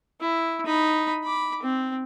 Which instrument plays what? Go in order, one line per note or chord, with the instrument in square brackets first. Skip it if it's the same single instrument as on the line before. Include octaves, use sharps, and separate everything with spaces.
[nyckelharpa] E4
D#4 B5
B5 D6
C4